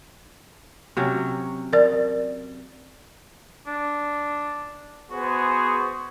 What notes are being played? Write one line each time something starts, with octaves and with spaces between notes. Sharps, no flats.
C3 F#3 C#4
A#4 D5
D4
B3 F#4 G#4 C5